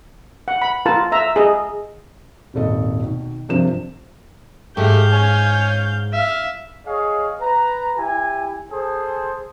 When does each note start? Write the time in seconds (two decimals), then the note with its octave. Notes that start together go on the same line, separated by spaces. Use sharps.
0.48 F#5
0.62 B5
0.86 F4 A#4 A5
1.12 E5 A#5
1.36 G#4 D#5
2.54 D#1 G#1 A4 D#5
3.02 B2 D#3
3.49 G2 C3 F3 A#4 C5 E7
4.77 G#2 A3 G4 F5 G6
5.13 C#4 C#5 G#5
6.13 E5 F5
6.86 G#4 C#5 D#5 F5
7.40 B4 A#5
7.97 E4 G4 G#5
8.71 G#4 A4 C5